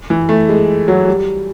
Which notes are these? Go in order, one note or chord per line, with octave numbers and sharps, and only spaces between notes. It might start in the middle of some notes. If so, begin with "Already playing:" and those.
E3
A3
G#3
F#3
G3